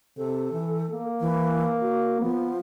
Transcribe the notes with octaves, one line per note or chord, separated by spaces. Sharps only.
C3 A4
E3
A#3
E3
F#4
F3 B3